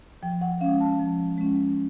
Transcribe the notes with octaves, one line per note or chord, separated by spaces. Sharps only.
F3 G5
F#5
G#3 C#4 F5
A5
F3
G#3 C#4